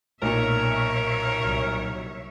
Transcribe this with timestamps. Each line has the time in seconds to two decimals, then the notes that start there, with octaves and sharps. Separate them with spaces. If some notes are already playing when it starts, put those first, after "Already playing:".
0.22 B1 A#2 A#4 C#5 E5
1.41 C2 F#3